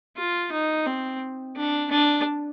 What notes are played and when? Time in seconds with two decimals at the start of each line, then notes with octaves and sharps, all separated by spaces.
0.17 F4
0.52 D#4
0.86 C4
1.56 D4
1.91 D4